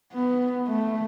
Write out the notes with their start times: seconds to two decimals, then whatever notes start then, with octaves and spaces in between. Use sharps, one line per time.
0.13 B3
0.68 A3